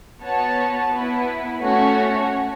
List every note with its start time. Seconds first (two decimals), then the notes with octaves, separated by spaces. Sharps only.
0.23 B3 F#4 C#5 A5
0.91 B3 E4 B4
1.61 A3 C#4 F#4 C#5